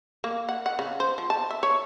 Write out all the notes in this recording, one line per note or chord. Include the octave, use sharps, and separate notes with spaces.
A#3
F#5
F#5
C#3
C5
F3
A5
E5
C#5